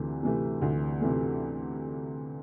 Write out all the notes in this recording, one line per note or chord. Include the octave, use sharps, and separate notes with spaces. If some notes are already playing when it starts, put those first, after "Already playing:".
Already playing: D2 C3 E3
C3 E3 A3
D2
C3 E3 A3